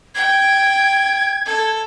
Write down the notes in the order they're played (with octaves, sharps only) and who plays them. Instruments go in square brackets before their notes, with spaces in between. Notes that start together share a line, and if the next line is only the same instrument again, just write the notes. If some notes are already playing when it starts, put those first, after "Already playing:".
[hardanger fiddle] G5 [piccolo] G#6
[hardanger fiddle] A4